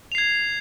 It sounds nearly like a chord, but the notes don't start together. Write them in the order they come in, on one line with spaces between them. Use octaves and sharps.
F7 C7 G#6